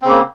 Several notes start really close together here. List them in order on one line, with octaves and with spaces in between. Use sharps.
C4 C#3 A#3